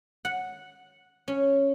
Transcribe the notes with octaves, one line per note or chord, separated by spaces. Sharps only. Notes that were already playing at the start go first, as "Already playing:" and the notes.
F#5
C#4